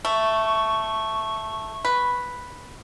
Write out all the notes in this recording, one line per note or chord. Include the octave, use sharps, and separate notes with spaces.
A3 C#6
B4